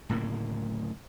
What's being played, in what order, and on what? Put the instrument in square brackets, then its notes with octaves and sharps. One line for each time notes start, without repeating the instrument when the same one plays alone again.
[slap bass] D1 A2 C#3 A#3